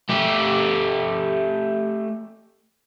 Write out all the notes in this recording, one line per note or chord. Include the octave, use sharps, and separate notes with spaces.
A3 G4